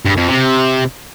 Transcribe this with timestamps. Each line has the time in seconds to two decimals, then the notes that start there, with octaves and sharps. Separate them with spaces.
0.05 G2
0.17 F2
0.28 C3